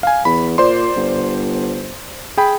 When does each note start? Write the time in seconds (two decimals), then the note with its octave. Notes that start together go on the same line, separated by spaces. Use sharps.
0.03 F5 G#5
0.25 E2 B5
0.58 A#2 C5 D5 C6
0.96 G1
2.37 G#4 G5 B5